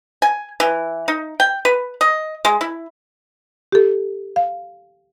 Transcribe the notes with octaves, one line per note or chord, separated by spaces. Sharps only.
G#5
E3
D#4
G5
B4
D#5
G#3
E4
G4 A4
F5